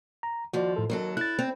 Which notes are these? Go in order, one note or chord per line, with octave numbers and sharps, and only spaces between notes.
A#5
D#2 F3 F#4 D5
A2 A4
D#2 F#3 A4 A#4
E4 F#6 A6
C4